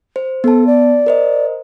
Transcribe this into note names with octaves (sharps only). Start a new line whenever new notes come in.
C5
B3 A4 A5
D5
A#4 C5 D#5